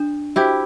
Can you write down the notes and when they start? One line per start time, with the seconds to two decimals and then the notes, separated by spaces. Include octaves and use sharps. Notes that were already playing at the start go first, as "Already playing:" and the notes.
Already playing: D4
0.36 E4 F#4 G4 C5 G5 B5